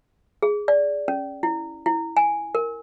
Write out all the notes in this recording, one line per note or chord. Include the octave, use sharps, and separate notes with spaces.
G#4
D5
C#4
E4
E4
G#5
A#4